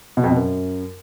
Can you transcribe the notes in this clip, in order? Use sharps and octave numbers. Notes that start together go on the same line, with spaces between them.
B2
F2
B2
F#2